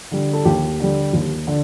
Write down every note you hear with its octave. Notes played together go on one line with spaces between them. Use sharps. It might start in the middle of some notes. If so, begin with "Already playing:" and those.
D3 G3
A4
D#2 G4
D3 G3
D#2
D3